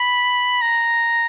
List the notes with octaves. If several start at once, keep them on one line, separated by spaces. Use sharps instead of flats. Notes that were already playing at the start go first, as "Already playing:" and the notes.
Already playing: B5
A#5